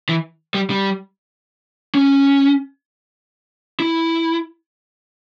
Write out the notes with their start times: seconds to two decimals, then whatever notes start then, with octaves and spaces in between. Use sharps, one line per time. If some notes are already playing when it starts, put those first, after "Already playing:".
0.09 E3
0.55 G3
0.70 G3
1.95 C#4
3.80 E4